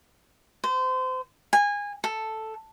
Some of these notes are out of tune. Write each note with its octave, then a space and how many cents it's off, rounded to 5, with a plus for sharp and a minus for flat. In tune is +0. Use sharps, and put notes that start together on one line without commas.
C5 -30
G#5 -25
A4 +0